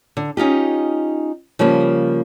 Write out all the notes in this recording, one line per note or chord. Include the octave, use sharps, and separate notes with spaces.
D3
C#4 D#4 F4 G4
C#3 F3 G3 A#3